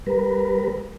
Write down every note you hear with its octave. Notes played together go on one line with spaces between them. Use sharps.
G3 A#4 B4